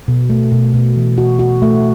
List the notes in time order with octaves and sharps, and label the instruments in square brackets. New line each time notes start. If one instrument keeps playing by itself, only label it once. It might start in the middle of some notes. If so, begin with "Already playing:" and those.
[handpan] B2
A3
B2
B2
E3
F#4
F#4
A3